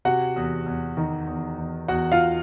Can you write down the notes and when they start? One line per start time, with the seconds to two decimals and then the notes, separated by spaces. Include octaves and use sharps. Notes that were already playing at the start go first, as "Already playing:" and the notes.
0.05 C3 F#4 F#5
0.36 E2
0.66 E2
0.97 D#3
1.27 E2
1.58 E2
1.88 E2 F#4 F#5
2.12 F4 F5